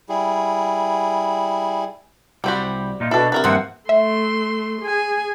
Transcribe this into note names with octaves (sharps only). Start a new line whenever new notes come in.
G3 E4 G#4
C2 G3 C4 F#4 G4 B5
A#2 D#4 F4
B2 D4 E4 A4
C3 F#4 A#4 B4
G2 C3 D#3 F3 A#3 C4 F#5
A3 E5 C6
G#4 G#5